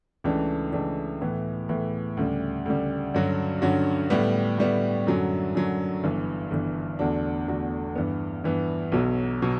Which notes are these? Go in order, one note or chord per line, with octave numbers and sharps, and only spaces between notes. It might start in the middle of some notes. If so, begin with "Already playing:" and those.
C#2 C#3 E3 A3 D4
C#2 C#3 E3 A3 D4
A2 E3 B3
A2 E3 B3
D2 C#3 G3
D2 C#3 G3
G2 D3 F#3 C#4 F#4
G2 D3 F#3 C#4 F#4
A2 G3 B3
A2 G3 B3
F#2 D3 F#3
F#2 D3 F#3
G1 G2 E3
G1 G2 E3
E2 D3 A3 D4 F#4
E2 D3 A3 D4 F#4
G2 E3 B3
G2 E3 B3
B1 B2 F#3
B2 F#3